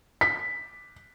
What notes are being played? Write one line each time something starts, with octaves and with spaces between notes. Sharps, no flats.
B6